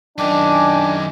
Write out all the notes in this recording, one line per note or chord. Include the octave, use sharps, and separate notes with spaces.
F#2 D#3 D4 D#5 G5 G#5 D6